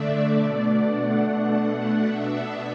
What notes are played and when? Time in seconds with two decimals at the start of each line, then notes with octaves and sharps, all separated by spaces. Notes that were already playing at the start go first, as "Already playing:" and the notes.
Already playing: D3 A3 D4 D5 E5
0.29 B2 A3 D4 D5
0.72 F#5
1.15 B2 A3 D4 F#5
2.00 B2 B3 D4 E5